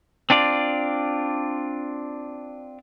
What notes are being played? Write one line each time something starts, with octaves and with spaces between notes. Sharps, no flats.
C4 D4 F4 D5